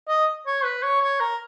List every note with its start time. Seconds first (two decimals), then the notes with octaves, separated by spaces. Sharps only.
0.08 D#5
0.46 C#5
0.64 B4
0.83 C#5
1.01 C#5
1.20 A#4